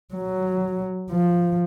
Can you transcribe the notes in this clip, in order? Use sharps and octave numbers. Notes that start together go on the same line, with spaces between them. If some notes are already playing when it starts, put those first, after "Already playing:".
F#3
F3